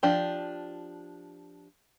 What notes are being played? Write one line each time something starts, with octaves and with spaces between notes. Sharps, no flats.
F3 D4 G4